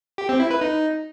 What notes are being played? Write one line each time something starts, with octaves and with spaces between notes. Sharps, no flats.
G4
C4
E4
B4
D#4